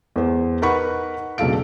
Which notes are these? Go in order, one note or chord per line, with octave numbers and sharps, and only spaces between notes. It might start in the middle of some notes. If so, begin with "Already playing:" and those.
E2 C5
D#4 A#4 B4 F#5 B5 C#6
E1 B1 C#3 A4 F5 D7